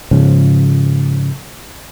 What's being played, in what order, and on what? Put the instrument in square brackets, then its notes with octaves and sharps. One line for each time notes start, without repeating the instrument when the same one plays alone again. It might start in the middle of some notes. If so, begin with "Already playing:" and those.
[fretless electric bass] G#2 C#3 F3